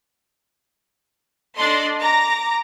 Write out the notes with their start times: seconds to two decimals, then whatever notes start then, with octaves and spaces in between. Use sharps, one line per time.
1.57 D4 A4 D5 D#5 C6
2.01 A#5 D6 A#6